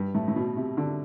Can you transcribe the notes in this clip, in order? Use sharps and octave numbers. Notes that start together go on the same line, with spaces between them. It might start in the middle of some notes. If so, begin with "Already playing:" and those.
Already playing: G2
A2
A2
B2
C3
D3